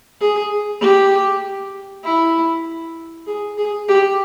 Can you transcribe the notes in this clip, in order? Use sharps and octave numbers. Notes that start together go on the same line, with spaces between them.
G#4
G4
E4
G#4
G#4
G4